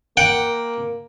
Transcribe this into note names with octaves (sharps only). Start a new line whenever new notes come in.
A#3 F#5 G5